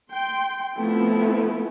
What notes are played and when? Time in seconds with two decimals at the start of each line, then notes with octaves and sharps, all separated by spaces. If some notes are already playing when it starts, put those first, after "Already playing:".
0.11 G5 C6
0.78 F3 A3 B3 C4 E4